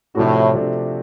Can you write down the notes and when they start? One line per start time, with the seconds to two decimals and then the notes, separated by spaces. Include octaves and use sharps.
0.15 A2 C3 F3 A3 D4 F#4
0.55 C3 F3 A3 D4